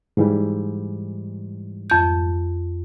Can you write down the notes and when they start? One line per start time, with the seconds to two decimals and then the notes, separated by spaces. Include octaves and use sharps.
0.17 G#2 E3 G3
1.90 F2 G6